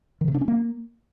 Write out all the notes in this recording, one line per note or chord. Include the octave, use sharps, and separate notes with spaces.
D#3
C3
D4
C#4
A#3